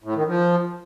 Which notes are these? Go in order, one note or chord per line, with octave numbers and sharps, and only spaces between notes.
A2
D#3
F3